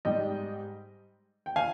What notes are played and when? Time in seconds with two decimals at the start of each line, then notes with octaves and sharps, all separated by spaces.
0.05 G#2 G3 D#5 G5
1.46 G5
1.56 F5 G#5